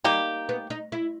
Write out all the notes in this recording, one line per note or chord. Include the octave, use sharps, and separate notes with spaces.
G3 A#3 D#4 G4
B3
D#4
E4